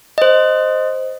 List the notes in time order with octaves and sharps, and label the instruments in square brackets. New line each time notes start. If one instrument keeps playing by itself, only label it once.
[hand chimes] C5 D#5